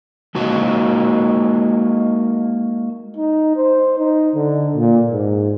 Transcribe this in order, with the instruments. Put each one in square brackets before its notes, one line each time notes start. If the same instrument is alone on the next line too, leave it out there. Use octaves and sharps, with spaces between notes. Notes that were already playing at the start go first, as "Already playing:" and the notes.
[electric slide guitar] G#3 A#3 D#4 F#4
[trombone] D#4
C5
D#4
D3
A#2
G#2